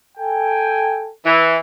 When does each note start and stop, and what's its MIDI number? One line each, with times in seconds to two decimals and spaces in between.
0.18 1.10 69
0.18 1.10 79
0.18 1.10 80
1.25 1.56 52